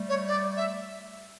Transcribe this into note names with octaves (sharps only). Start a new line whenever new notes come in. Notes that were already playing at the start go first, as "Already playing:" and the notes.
Already playing: G3 A3
C#5
D5
E5